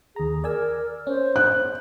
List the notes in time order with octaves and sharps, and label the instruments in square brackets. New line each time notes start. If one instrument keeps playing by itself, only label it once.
[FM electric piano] D#2 A#5 [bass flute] G#4
[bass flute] A#4 [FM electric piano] D5 G#5 E6
[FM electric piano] C#4 [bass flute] C5
[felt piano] F#6